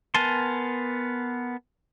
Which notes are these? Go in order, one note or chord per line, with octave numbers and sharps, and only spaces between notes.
B3 A#4 G#5 A5 C6